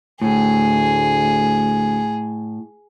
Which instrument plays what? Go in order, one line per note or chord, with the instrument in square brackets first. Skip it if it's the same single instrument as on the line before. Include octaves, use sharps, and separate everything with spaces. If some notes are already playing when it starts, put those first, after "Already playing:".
[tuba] D2 [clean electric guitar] A2 [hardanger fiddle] G#4